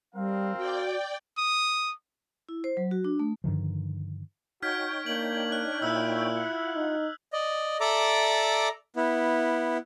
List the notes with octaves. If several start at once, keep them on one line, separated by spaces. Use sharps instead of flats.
G3 C4 A#4 F5
F#4 D5 G5
D#6
E4
C5
F#3
F#4
D4
A3
G2 D3 D#3 F3
D#4 F#4 C#5 G5 F6 G#6 B6
A#3 D4 F#7
F#6
A#2 E4 E6 G6
F4 F#5
D#4
D5 D#5
A4 D5 E5 A#5 D6
B3 E4